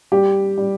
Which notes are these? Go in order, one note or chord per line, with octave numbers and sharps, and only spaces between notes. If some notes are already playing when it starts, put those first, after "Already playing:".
G3 G4
G3